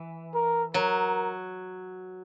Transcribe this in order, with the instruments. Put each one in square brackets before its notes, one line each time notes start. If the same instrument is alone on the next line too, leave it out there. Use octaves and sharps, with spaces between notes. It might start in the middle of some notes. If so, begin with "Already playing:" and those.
Already playing: [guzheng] E3
[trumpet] A#4
[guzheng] F#3 [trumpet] A#4